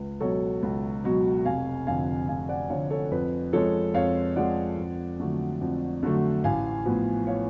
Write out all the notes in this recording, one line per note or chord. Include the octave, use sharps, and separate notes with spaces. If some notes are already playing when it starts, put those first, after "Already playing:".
Already playing: C#2 B4
B2 F#3 A4 C#5
C#2
B2 F#3
F1 F5 G#5
F2 D3 F5 G#5
F1 F5 G#5
D5 F#5
F2 D3 C#5 F5
A4 C#5
F2 B4
F3 G#3 A4 C#5
F2 C#5 F5
F3 G#3 D5 F#5
F2
D3 F#3 A3
F2
D3 F#3 A3
A1 F5 G#5
A2 F3 B3
C#5 F5